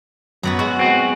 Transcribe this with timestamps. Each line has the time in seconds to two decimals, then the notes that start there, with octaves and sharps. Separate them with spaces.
0.43 F#2 F#3 B3 F#4
0.59 G#3 E4 F#4
0.79 C4 F#4